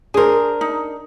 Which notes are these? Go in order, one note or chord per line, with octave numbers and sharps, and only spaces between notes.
D4 G#4 A#4 C5
D#4